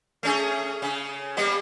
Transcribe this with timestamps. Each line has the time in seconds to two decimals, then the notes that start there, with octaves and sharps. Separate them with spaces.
0.23 A3 C#4 G#4
0.82 C#3
1.37 G3 A#3 B3